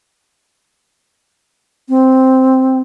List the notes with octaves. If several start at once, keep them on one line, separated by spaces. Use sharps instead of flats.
C4